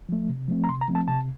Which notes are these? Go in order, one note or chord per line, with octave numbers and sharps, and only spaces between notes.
F3 A3
C3
F3 A3 C4
A#5
C3 C6
A#5
F3 A3 C4
A5
C3 A5